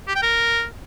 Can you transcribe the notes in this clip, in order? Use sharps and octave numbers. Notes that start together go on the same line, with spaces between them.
G4
G5
A#4